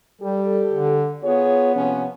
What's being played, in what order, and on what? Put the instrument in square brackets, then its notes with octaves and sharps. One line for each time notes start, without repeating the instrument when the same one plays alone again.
[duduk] G3 [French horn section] G4 A4
[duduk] D3
[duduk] B3 [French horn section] F4 G#4 C#5
[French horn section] C3 F3 C#4